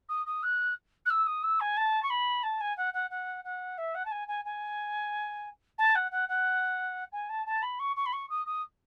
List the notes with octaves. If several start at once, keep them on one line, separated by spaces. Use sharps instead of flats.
D#6
D#6
F#6
F#6
E6
D#6
E6
G#5
A5
C#6
B5
A5
G#5
F#5
F#5
F#5
F#5
E5
F#5
A5
G#5
G#5
G#5
A5
F#5
F#5
F#5
G#5
A5
A5
B5
C#6
C#6
B5
C#6
D#6
D#6